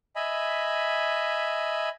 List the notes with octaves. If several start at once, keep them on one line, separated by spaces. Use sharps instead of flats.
D#5 E5 G#5 B5